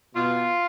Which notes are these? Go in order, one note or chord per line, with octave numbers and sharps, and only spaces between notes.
B2 F4